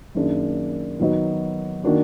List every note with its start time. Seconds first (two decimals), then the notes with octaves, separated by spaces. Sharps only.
0.15 F#2 D#3 A#3 D4 G#4
0.99 D#3 F#3 B3 D#4
1.84 D#3 A#3 D4 F#4